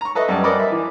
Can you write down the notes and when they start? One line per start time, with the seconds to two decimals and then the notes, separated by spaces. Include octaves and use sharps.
0.01 A#5 C#6
0.15 A4 B4 D#5 E5
0.28 F#2 G3 A5
0.44 A#4 C5 D5 D#5 F#5 B5
0.60 E5
0.72 E3